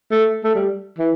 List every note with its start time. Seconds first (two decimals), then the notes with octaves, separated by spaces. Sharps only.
0.11 A3
0.44 A3
0.55 G3
0.99 E3